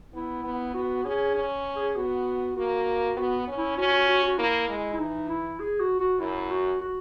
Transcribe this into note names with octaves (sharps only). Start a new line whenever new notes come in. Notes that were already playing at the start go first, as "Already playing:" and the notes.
B3 E4
B3
B3 F#4
C#4 G#4
C#4
G#4
B3 F#4
A#3 F#4
B3 F#4
C#4
E4
C#4 F#4
F#4
F#4
F#4
A#3 E4
G#3
E4
E3 D#4
E4
G#4
F#4
F#4
F#2 E4
F#4
F#4